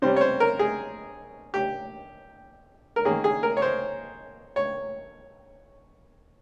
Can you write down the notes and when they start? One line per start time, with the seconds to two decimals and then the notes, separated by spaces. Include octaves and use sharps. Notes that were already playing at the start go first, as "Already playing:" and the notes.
0.02 C3 G3 C#4 C5
0.16 C#5
0.21 C5
0.40 A#4
0.59 G#4
1.54 G4
2.96 A#4
3.05 D#3 A#3 C#4 G#4
3.24 G#4
3.43 A#4
3.57 C#5
3.62 C5
4.56 C#5